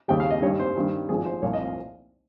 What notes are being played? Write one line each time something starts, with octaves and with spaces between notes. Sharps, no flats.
D#2 C#3 G3 G5
F5
D#5
G2 D#3 G3 C#5
C5
G2 D#3 G3
G#1 G#2 F3 G#4
C5
C2 A#2 F3 C#5
D#5
F5